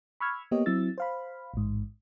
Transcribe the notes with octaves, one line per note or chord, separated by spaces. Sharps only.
B5 C#6 E6 F6 G#6
A#3 B3 G4 C#5 D#5
F#3 C4 E4 E6 A6
C5 F5 B5
A1 G#2